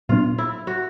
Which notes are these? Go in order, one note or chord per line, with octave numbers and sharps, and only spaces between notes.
A#2 F#3 B3 D4 F4
E4
F#4